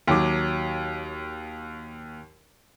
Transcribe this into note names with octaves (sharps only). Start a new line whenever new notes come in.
D#2 F#3 D6